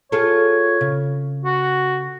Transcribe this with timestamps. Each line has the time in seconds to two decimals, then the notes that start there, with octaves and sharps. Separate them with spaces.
0.12 F4 G#4 A4 C#5
0.81 C#3
1.45 F#4